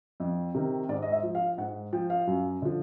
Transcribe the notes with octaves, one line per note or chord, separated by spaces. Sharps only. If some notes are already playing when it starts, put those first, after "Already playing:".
F2
C3 D#3
G#2 D5
D#5
E5
F3
F5
G#2 F#5
F3 G5
F5
F#2
D3 F3